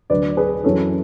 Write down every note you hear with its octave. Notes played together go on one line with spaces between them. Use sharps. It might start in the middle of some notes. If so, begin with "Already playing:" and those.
D2 D3 F#3 B4 D5
G#4 B4
F#2 E3 A4 C#5